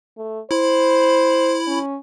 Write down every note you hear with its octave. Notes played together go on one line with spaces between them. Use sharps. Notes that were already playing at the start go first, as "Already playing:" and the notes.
A3
E4 C5 B5
C#4